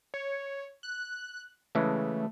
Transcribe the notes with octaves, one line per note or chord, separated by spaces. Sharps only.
C#5
F#6
C#3 E3 G#3 A3